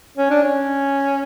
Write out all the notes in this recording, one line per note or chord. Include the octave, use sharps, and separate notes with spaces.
C#4
D4
C#4